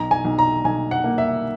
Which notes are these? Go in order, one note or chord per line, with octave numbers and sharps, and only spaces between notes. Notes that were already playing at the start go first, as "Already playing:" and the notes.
Already playing: B1 A#5
G#5
B1
A#5
B1 G#5
F#5
A#3
E5